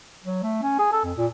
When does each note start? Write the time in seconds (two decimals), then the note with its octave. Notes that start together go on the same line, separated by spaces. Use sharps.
0.24 F#3
0.43 A3
0.62 C#4
0.79 G#4
0.92 A4
1.04 F2
1.17 A#2